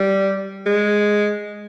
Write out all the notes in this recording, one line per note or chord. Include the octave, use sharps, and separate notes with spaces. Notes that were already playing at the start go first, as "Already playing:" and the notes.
Already playing: G3
G#3